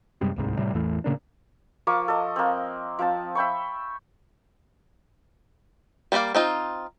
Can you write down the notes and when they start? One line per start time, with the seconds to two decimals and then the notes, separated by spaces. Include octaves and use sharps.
0.21 F#2 C3 G3 G#3
0.36 D1 C2 G#2
0.59 A2 C3 G3
0.74 A1 E2 E3 A3
1.04 A2 C#3 A#3 D4
1.87 F3 A#3 C#6 D6
2.08 A4 D#5
2.36 A#3 C4
2.99 F3 C4 A5
3.35 E5 G5 B5 C#6
6.12 G3 A#3 F4 D5 F5
6.35 C4 D#4 F4